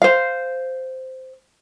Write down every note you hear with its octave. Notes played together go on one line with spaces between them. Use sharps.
C5 F5